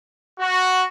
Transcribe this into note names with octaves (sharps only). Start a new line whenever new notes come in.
F#4